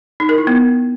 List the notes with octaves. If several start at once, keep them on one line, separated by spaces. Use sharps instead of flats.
D#4
A#4
E4
B3